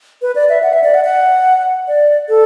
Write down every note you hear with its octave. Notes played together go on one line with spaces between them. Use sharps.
B4
D5
E5
F#5
E5
D5
F#5
F#5
D5
A4